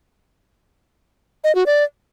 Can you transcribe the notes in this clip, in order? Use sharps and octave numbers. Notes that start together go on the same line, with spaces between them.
D#5
F#4
D5